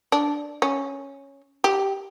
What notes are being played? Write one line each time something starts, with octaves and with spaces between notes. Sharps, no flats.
D4
C#4
G4